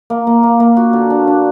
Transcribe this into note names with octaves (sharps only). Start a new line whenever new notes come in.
A#3
A#3
A#3
A#3
F#4
D3
D4
D4